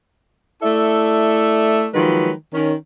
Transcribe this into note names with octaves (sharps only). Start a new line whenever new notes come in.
A3 E4 A4 D5 E5
D#3 F3 F#3 G#3 B4
D#3 C#4